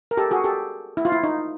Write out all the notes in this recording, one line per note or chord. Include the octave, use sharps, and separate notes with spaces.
A#4
G4 A4
F#4 G#4
G4 A4
E4
F4
E4
D#4